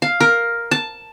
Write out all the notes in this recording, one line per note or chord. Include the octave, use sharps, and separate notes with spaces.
F5
A#4
A5